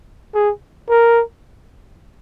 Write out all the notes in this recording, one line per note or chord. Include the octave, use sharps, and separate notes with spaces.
G#4
A#4